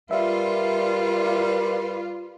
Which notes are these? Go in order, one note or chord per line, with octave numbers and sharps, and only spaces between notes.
G3 F4 A#4 B4 D5 E5 F5